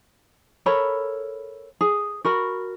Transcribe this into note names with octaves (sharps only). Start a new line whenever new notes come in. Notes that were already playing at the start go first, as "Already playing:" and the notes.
A4 A#4 C#5 B5
G#4
F#4 A#4 B5